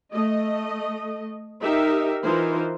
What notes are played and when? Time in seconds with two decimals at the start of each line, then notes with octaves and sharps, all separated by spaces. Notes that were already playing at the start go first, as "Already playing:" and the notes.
0.13 A3 D#5
1.63 D#4 G4 A#4 E5
2.23 E3 D#4 F4 A#4 C5